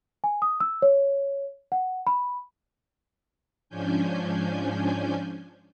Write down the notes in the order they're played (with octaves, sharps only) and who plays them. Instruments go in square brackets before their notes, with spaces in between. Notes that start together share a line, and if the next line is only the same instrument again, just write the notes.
[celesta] G#5
D#6
E6
C#5
F#5
B5
[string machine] G#2 F3 C#4 D4 G#5 G6